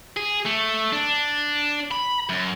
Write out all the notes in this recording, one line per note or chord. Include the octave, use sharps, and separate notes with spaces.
G#4
A3
D4
B5
F#2